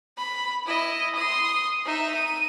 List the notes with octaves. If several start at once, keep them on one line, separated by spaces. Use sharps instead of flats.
B5
E4 D#5
C6 D#6
D#4 E5
D#7